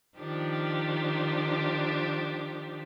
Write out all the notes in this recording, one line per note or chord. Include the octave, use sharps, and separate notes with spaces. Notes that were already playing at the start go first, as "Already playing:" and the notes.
D#3 F3 D4 G4